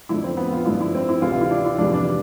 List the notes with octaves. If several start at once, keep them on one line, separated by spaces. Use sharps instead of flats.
F2 D3 F3 E4
C4
B3
F4
G2 D3 F3 E4
E4
C4
E4
D2 C3 E3 G3 F4
F4
E4
D4
E4
F2 C3 E3 G3 D4
D4